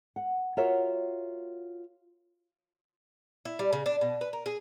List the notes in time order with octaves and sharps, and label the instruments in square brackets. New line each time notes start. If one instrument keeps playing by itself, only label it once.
[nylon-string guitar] F#5
F4 F#4 A#4 C#5 E5
[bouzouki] E4
G3
C#3
D4
B2
B4
A#4
G#4